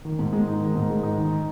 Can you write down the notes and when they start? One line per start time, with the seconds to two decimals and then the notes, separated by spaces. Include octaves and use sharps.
0.05 D#3
0.19 G#2
0.32 G#3
0.47 D#4
0.61 D#3
0.75 G#2
0.90 G#3
1.03 D#4
1.18 D#3